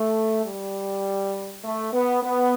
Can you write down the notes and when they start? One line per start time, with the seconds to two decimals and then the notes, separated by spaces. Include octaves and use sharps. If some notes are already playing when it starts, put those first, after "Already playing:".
Already playing: A3
0.44 G3
1.63 A3
1.93 B3
2.23 B3